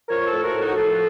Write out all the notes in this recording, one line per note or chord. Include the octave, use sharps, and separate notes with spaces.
F3 A#4 C#5
A4 C5
A2
F#4 A#4
A2
D#4 F#4
F3 F4 A4